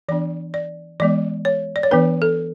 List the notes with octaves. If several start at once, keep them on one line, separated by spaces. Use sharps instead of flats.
E3 B3 D4 D5
D5
E3 G#3 B3 D5
C#5
D5
C#5
E3 B3 D4 B4
A4